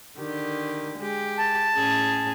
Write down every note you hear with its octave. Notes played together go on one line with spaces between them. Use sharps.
D3 D#3 G4
G#3 G4
A5
A2 C#4 G#4